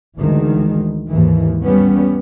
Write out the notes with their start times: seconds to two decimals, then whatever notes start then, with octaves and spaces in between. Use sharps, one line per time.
0.19 D2 D#3 E3 G#3
1.10 D#2 G#2 E3
1.62 G3 B3 C#4